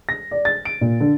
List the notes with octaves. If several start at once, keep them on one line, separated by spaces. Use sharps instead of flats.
A#6
D5
A6
D7
A#2
D3